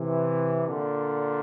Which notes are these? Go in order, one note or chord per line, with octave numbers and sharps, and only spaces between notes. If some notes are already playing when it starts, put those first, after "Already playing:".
Already playing: C3 E3
A#2 D3